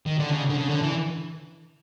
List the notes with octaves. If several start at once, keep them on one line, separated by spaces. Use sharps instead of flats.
D#3
D3
C#3
D3
C#3
D3
E3